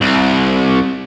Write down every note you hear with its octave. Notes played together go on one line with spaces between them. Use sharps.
C2